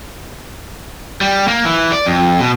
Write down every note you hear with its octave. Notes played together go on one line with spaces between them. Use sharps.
G3
A#3
E3
D5
F2
B2